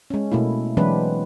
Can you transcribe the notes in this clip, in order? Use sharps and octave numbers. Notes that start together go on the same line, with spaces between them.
G#3 C#4
B2 A3 A#3 E4
E3 F#3 G#3 C4 D4 B4